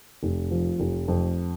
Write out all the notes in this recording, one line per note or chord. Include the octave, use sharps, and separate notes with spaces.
F1
F3
F1
F2